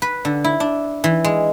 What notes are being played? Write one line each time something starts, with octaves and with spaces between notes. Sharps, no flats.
B4
D3
E4
D4
E3
G#3